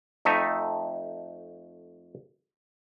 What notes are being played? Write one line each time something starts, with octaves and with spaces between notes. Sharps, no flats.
F2 A3 D#4 E5